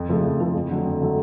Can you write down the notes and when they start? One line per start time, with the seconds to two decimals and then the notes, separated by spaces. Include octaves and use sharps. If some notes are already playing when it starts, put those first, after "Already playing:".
Already playing: F2
0.08 C#3 F3 A3
0.23 F2
0.40 C#3 F3 A3
0.55 F2
0.70 D3 F#3 A3
0.85 F2
1.01 D3 F#3 A3